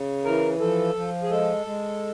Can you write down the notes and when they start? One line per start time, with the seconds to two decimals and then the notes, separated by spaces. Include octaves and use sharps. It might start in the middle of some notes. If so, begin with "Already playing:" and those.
Already playing: C#3
0.25 E3 A#4
0.60 F3 A4
0.95 F3
1.23 G#4
1.30 G#3 A4
1.66 G#3